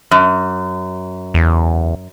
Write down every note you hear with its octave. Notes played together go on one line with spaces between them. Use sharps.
F#2
E2